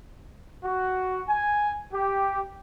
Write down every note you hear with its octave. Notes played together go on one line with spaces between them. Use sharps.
F#4
G#5
G4